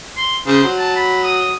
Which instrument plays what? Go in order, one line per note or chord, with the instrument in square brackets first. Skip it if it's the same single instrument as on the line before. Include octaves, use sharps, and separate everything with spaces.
[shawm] C6
[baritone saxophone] C#3 [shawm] C5
[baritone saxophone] F#3
[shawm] A5
B5
D#6